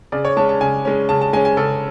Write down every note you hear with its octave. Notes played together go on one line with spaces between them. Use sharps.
C#3 D5
C#5
G#3 C#4 A5
A5
C#3 G#5
G#3 C#4
C#3 A5
A5
G#3 C#4 G#5
G#5
C#3 A4